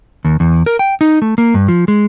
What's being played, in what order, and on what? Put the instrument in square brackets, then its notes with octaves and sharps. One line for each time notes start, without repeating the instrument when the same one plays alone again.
[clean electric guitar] D#2
E2
A#4
G5
D#4
A3
A#3
G2
F3
G#3